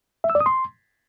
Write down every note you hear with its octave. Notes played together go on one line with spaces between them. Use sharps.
E5
E6
D5
D#6
C6